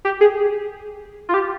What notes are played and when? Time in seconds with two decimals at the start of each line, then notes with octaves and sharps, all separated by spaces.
0.05 G4
0.21 G#4
1.29 F4
1.34 G4